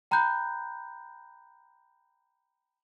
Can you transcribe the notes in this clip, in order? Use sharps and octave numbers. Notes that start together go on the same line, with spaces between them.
G5 A#5 B5 F#6 G6